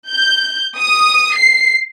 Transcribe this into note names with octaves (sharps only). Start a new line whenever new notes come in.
G6
D#6
C7